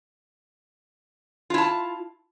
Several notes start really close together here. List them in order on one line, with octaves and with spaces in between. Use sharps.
F4 E4 A5